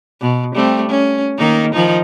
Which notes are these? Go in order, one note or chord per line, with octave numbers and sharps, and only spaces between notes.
B2
G3 A3 C4
C#4
D#3 A#3 D#4
D#3 F3 D#4